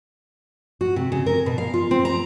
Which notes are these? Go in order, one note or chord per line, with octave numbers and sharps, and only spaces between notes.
F#4
C3
C#3
A#4
B2
F5
F4
C4
A#5